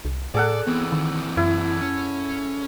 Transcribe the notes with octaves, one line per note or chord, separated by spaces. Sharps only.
C2
A2 G#4 A4 D5 F#5
E3 B3 C4
D#3
F#2 E4
C#4